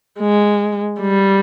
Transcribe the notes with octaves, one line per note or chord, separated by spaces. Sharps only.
G#3
G3